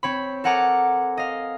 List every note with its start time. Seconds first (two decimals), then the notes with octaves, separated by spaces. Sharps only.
0.03 C4 C#5 B5
0.44 A4 A#4 F#5 G#5 A#5 D6
1.17 D#5 F5